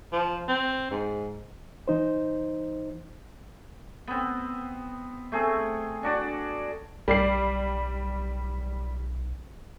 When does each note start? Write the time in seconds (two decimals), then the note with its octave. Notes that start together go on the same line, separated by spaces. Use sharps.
0.12 F3
0.48 C4
0.91 G#2
1.88 E3 D#4 C5
4.08 B3 C4
5.32 A3 C4 G#4
6.03 D4 F#4 D5
7.08 B1 G3 D5 C7